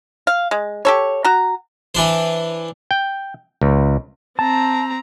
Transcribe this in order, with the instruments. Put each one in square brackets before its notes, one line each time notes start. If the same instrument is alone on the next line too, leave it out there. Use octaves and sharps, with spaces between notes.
[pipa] F5
G#3
G4 A4 C#5
F#4 A#5
[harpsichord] E3 D4 C5
[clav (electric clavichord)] G5
C#2
[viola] C4 A#5 [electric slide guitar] A5